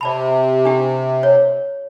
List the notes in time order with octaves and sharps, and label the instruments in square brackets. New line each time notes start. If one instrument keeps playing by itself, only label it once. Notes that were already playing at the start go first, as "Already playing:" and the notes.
[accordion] C3 [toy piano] D5 A5 B5
[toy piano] D4 G4
C#5